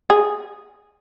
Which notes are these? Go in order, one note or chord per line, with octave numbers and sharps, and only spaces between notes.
G#4